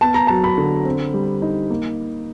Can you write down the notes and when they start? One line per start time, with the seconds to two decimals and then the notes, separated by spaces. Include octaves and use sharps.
0.01 B3 A5
0.14 A#5
0.27 A5
0.30 F#3
0.44 B5
0.58 D3
0.85 C4
1.14 G3
1.42 D#4
1.70 A#3